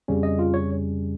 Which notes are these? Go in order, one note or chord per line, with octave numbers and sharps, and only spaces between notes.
F2 C#3 G3 C#4
D#5
F4
C#5